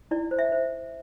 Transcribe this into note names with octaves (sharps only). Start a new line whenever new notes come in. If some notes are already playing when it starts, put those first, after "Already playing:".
E4 D5
C5
E5
C5